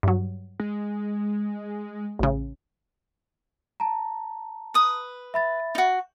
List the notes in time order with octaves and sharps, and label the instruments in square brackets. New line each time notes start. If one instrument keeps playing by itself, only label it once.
[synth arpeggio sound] G2 F#3
[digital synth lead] G#3
[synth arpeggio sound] A1 C#3
[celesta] A5 A#5
[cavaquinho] B4 D#6
[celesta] E5 B5 A6
[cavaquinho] D#4 F#4